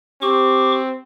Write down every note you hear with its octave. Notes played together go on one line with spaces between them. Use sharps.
C4 G4 C#6 D6